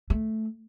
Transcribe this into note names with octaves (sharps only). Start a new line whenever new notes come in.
A3